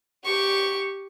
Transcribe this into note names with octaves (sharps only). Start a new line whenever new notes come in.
G4 C#6